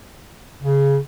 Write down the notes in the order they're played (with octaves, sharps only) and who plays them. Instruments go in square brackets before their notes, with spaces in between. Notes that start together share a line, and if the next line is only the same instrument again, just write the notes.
[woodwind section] C#3